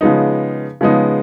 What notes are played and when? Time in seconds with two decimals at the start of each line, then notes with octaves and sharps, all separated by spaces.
0.01 C#3 F3 G#3 B3 D#4
0.81 C#3 F3 G#3 B3 D#4